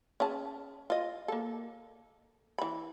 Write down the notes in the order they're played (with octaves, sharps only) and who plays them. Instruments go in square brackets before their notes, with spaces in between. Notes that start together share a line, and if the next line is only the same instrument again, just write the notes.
[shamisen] C#4 G#4 A5
F4 D#5
A#3 A4
E3 B5